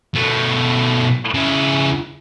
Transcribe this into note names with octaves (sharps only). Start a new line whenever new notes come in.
B2 A3
C#3 E4